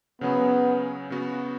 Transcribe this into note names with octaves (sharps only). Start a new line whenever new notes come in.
C#3 F#3 B3 C#4 G#4
C#3 B3 F#4